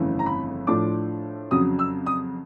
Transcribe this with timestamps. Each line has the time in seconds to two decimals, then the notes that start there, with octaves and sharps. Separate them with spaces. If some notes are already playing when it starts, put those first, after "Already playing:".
Already playing: G1 F2 C#3 E3 A3
0.19 A#5
0.26 B5
0.67 A2 F3 A3 D4 F4 D6
1.51 F2 C#3 F#3 D#6
1.79 E6
2.06 D#6